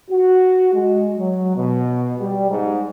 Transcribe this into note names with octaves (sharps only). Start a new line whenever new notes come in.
F#4
G#3
F#3
B2
G3
G#2